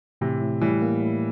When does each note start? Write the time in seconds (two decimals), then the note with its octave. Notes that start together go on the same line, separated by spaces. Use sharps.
0.21 A2 C3 E3
0.42 A2
0.61 A2 E3 G3
0.82 A#3
1.01 A2